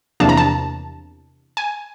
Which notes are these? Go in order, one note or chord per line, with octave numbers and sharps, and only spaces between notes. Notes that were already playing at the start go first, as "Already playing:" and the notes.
E2 C3 F3 A#3 D4 A5
A#5
A5
G#5